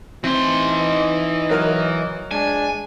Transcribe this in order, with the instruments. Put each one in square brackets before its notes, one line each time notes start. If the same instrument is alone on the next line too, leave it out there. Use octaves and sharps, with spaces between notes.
[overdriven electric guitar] E3 C6 [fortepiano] C4 [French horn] D#4
[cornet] D#5
[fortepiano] F#3 A#4 F6
[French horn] G#3 [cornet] D4 [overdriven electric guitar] G#5